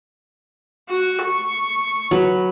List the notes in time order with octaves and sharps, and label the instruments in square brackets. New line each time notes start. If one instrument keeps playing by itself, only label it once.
[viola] F#4
C#6
[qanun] F#3 B4